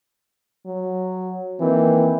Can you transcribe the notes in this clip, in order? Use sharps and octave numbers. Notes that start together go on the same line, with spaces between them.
F#3
D#3 E3 A#3 C4